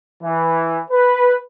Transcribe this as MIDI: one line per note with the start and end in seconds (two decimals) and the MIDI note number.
0.23 0.80 52
0.91 1.35 71